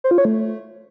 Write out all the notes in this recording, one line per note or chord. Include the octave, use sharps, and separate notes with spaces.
C5
F4
C#5
A3